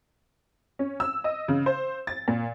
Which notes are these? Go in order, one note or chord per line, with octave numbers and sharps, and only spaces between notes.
C#4
E6
D#5
C#3
C5
A6
A#2